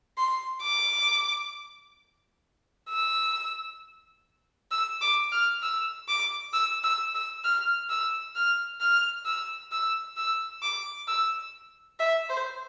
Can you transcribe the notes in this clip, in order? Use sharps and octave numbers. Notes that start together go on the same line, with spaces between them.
C6
D6
E6
E6
D6
F6
E6
D6
E6
E6
E6
F6
E6
F6
F6
E6
E6
E6
D6
E6
E5
C5